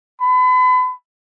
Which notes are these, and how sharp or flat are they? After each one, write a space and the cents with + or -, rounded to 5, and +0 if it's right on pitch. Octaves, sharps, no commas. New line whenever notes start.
B5 +35